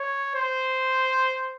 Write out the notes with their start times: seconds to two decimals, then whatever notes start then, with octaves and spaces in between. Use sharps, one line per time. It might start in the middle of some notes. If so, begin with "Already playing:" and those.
Already playing: C#5
0.35 C5